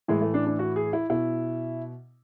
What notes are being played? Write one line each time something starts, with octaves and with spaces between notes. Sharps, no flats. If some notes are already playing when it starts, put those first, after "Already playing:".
A2 E3 G#3
A3
D4
D4
F#4
G#4
E4
B2 E4